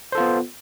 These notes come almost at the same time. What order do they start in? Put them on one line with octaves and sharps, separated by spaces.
C5 A4 F4 B3